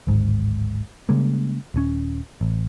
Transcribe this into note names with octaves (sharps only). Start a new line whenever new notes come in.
D1 G#1 G#2
C#3 G3 G#3 A#3
D#1 C3 C#4
A1